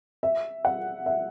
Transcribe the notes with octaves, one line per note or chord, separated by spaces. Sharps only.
E5
F#5
E5